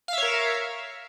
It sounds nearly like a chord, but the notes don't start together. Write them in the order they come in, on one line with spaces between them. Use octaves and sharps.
F5 E5 C#5 A#4